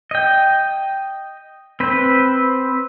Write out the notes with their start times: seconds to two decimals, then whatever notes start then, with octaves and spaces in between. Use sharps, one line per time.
0.11 D#5 G5
1.80 C4 B4 C5